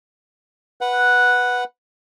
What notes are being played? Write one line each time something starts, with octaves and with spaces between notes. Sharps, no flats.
B4 F#5